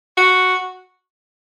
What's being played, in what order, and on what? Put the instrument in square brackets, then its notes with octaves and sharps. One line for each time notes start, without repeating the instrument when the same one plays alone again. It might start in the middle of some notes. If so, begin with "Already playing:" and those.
[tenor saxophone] F#4